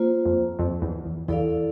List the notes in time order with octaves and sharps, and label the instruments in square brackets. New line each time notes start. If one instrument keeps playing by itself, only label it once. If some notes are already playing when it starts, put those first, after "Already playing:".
Already playing: [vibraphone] A#3 F4 C5
[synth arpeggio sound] F2
F2
E2
E2
[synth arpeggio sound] E2 [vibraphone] E4 A4 D5 F5